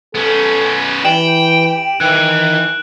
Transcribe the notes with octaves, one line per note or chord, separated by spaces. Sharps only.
B3 C#4 A4
E3 G4 G5 D7 E7 F#7
D#3 E3 F#6